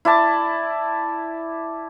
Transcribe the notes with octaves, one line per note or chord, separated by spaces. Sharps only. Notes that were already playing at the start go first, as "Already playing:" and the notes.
E4 D5 A5